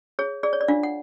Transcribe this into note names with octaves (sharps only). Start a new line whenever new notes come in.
G#4 C#5
G#4 D5
C#5
D5
D4 F4 F5
F#5